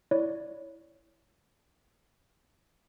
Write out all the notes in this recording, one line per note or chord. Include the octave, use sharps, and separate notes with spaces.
E4 C#5 D5